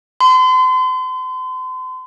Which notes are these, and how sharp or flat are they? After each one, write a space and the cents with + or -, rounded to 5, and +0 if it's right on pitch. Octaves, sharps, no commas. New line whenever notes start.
C6 -40